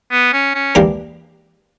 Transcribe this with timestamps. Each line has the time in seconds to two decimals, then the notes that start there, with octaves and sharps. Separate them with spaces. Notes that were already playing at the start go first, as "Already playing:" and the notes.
0.12 B3
0.33 C#4
0.55 C#4
0.75 E3 A#3 D4 G4 A#4